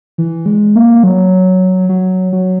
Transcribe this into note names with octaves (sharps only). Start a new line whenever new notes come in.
E3
G#3
A#3
F#3
F#3
F#3